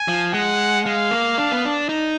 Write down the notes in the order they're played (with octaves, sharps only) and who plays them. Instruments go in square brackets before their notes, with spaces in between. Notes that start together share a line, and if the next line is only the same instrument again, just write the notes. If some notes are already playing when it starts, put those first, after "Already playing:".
Already playing: [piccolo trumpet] G#5
[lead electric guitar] F3
[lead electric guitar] G#3 [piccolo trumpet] F#5
[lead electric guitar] G#3 [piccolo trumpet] F5
[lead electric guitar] A#3
D4
B3
D4
D#4